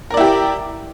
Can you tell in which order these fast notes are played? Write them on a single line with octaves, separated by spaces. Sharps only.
A#4 D5 E4 G4